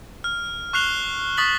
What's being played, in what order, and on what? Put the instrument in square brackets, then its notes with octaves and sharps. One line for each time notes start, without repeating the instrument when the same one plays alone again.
[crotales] F6
C#6 F6 F#6 C7 F7 G7
C#6 D#6 A6 B6 F#7